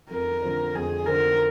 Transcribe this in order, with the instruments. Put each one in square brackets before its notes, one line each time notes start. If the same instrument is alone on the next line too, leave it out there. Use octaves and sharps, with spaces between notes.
[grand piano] F2 [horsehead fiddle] A#4
[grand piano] D3 F3 C4
[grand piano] F2 [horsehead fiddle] G#4
[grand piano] D3 F3 C4 [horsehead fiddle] A#4